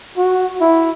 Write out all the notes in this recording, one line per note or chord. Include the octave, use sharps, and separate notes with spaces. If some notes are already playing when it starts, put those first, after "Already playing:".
F#4
E4